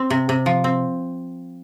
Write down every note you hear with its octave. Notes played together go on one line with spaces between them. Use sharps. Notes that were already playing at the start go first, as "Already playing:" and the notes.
Already playing: C4
C3
C3
F3
C4